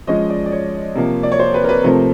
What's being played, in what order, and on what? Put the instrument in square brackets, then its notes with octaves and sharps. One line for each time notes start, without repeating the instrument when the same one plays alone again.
[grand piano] F3 G#3 C#4 D#5
D5
D5
C#5
C3 F3 A#3
D5
C#5
C5
B4
A#4
B4
C3 F3 A3 C4 A#4